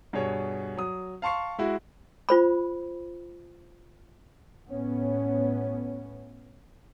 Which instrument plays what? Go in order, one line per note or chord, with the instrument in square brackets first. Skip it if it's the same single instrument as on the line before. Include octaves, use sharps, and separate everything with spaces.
[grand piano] G2 B2 G#4 C#5
F#3 D#6
F5 A5 C6 C#6 C7
G#3 E4 F#4
[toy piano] F4 C5 B5
[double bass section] A2 B3 C#4